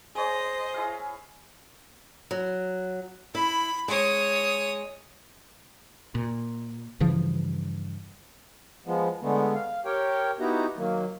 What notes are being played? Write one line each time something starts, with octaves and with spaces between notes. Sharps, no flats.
G#4 C5 C#5 D#5
E4 G#4 F5
F#3
E4 B5
G#3 C#5 D#6
A#2
G2 C#3 E3 F3
F3 G#3 B3
D3 G#3 A3 B3
F5
G4 A#4 C#5 G5
B3 D#4 E4 F#4 G4 A#5
D#3 F#3 A#3